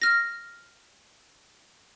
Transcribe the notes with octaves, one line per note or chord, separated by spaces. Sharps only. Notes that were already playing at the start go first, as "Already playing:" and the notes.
F6 A#6